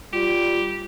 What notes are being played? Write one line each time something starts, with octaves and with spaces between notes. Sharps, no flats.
G3 F4 G4